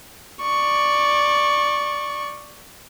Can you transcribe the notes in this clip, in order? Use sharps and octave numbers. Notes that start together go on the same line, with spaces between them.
D5 C#6